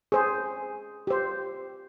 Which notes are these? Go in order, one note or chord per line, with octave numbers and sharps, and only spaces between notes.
G#4 C5
G4 C5